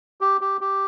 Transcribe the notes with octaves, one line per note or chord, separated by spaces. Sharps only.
G4
G4
G4